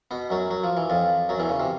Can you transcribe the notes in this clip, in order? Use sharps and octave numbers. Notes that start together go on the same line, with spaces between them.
B2 B3
F#2 F#3
F#3
F3
E3
F2 F3
F#2 F#3
E2 E3
C#3
C3